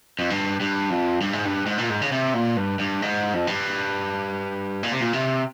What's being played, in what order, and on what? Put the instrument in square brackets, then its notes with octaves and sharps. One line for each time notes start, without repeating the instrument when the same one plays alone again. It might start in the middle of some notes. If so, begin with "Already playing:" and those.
[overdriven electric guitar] F2
G2
G2
F2
G2
G#2
G2
G#2
A#2
G#2
C#3
C3
A#2
G2
G2
G#2
F2
G2
A#2
C3
A#2
C3